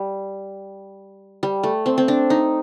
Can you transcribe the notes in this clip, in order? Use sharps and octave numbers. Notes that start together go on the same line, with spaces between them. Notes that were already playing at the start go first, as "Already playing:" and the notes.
Already playing: G3
G3
A3
C4
C4
D4
D#4